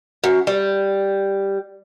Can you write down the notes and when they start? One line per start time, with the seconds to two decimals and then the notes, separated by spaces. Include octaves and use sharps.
0.24 F#2
0.47 G3